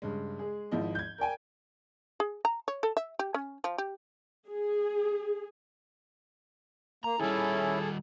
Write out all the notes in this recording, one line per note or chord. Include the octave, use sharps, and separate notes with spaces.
G2 C#3 G#3
G#3 G#4
G#1 G#2 F3 E4 D#5
G6 G#6
A#4 D5 G5 G#5
G#4
A#5
C#5
A4
E5
G4
C#4
F3
G4
G#4
A#3 A#5
D#3 G3 C#4 E4 G#4 A4